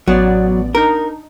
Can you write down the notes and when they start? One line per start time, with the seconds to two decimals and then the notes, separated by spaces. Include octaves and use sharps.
0.08 A1 F#3 B3 D5
0.75 D4 D#4 A#4